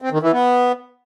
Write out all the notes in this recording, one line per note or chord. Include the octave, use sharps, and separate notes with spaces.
C4
D#3
E3
B3